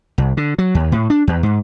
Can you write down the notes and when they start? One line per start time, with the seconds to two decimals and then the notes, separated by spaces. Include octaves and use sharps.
0.18 C2
0.37 D3
0.58 F#3
0.75 D#2
0.92 A2
1.10 D4
1.27 E2
1.43 G#2